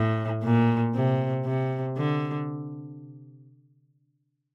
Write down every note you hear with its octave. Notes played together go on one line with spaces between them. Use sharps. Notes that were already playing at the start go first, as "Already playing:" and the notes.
Already playing: A2
A#2
C3
C3
D3